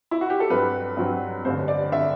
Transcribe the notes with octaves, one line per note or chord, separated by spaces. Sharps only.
E4
F#4
G4
A4
G2 F#3 C4 B4
G2 F#3 C4
A1 G2 D3 C5
D5
D3 E5